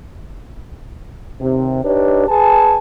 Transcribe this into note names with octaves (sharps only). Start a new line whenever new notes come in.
D#2 C3
D4 D#4 G4 B4 C#5
G#4 B4 G#5 A5